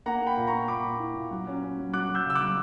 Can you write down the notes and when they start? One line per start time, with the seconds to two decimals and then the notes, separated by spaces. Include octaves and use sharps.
0.06 A#3 F#5 A#5
0.21 A#3
0.27 G5 B5
0.37 A#2
0.47 A#5 C#6
0.53 A#3
0.68 A#2 B5 D6
0.84 A#2
0.99 E4
1.15 A#2
1.31 F#3
1.47 C#4
1.62 C#4
1.78 F#3
1.93 F#3 D6 F#6
2.09 F#3
2.14 E6 G6
2.25 C#3
2.30 E6
2.35 D6 F#6
2.40 F#3